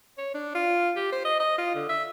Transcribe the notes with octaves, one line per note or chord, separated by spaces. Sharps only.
C#5
D4
F4
G4
C5
D#5
D#5
F4
D3
E5